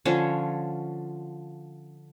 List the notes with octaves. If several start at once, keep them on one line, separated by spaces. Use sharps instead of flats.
D3 F3 C#4 C#5